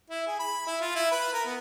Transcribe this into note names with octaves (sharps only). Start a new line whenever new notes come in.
E4
G#4
B5
E4
F4
E4
B4
A#4
B3